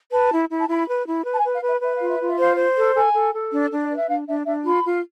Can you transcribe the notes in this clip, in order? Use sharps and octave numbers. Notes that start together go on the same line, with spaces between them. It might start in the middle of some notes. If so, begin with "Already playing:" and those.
B4 A5
E4
E4
A5
E4 B5
B4
E4
B4
A5
G#5
B4
F5
B4
E5
B4 E5
F5
F4
E5
F4
E5
C5 F5
C5
A4
A4 G#5
A4
A4
D4
D4
D5
B4
E5
D4 F5
D4 E5
D4 E5
F4 B5
F4